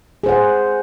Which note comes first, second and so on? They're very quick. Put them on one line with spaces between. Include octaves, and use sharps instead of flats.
G#4 C5 F#5